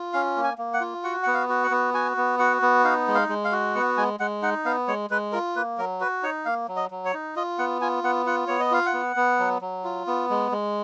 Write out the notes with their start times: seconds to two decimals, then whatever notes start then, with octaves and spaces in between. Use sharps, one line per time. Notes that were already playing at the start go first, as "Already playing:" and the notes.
Already playing: F4
0.13 C#4 F5
0.37 A#3
0.44 G#5
0.58 A#3
0.74 F#5
0.81 F4
1.04 F#4 F#5
1.23 B3 F#5
1.34 F5
1.49 F#4
1.64 F#5
1.71 B3
1.94 F#4 G#5
2.17 B3
2.39 F#4 F#5
2.62 B3
2.84 D#4 F5
3.08 G#3
3.15 F5
3.29 G#3
3.45 F5
3.52 F#4
3.75 B3 F#5
3.97 G#3 G#5
4.20 G#3 F#5
4.42 D#4 F#5
4.65 B3 F5
4.88 G#3 C#5
5.10 G#3 B4
5.32 F4 A#4
5.56 A#3 B4
5.78 F#3 A#4
6.00 F#4 B4
6.23 D#4 C#5
6.45 A#3 F5
6.68 F#3
6.76 D#5
6.91 F#3
7.05 C#5
7.14 D#4
7.36 F4 D#5
7.59 B3 F#5
7.81 F4 G#5
8.04 B3 F#5
8.26 F4 F#5
8.47 B3 C#5
8.60 D#5
8.71 F4 F5
8.86 F#5
8.94 B3
9.16 B3
9.39 F#3
9.61 F#3
9.84 F4
10.07 B3
10.30 G#3
10.52 G#3